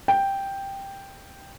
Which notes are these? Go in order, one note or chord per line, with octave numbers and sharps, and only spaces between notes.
G5